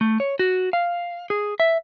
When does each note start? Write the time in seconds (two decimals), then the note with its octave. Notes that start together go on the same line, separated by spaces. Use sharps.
0.01 A3
0.20 C#5
0.39 F#4
0.73 F5
1.30 G#4
1.60 E5